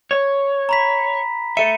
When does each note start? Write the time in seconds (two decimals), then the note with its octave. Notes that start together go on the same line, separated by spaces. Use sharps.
0.11 C#5
0.69 A#5 B5 B6
1.57 A4 E5 C#7 D#7